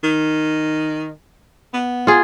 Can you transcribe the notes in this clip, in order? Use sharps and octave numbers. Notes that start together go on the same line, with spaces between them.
D#3
B3
F4 G#4